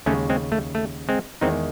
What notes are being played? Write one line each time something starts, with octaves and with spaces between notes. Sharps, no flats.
D#2 C#3 G#3 A3 C#4
G#3 C4
A3
A3
G#3 C4
E2 D#3 G#3 C4 D#4